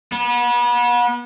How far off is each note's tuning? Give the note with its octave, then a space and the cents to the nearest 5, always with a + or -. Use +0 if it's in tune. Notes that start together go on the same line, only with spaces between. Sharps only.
B3 -35